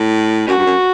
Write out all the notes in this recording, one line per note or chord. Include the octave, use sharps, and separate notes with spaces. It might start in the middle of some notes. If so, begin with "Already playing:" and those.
Already playing: A2
F#2 F#4
G2
F#2